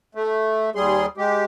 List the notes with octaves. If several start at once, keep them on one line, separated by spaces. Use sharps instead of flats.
A3
D#2 G3 G#4 C6
G#3 G4